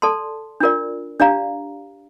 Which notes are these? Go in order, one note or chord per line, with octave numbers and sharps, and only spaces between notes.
A4 D5 A5 C6
D4 F4 A#4 D5
D4 G4 D5 F5 A#5